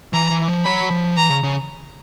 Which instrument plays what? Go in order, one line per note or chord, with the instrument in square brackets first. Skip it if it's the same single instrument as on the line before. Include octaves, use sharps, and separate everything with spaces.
[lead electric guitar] E3 [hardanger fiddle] A#5
[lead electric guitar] E3
F3
[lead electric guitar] F#3 [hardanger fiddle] B5
[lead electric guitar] F3
[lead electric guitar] E3 [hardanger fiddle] A#5
[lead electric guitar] C#3
C#3